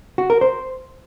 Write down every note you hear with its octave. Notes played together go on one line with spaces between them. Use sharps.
F#4
A#4
C5